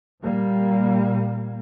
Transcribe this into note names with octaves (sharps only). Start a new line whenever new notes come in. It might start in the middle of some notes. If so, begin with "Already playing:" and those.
A#2 G3 A#3